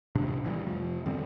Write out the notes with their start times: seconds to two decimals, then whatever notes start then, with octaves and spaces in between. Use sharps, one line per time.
0.15 A2 C3 D4
0.44 B1 E3 F#3 G3
0.64 F1 F3
1.06 F#2 D3 G3 C4